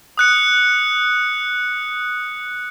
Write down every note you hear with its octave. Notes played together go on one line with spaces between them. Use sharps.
D#6 F#6 C#7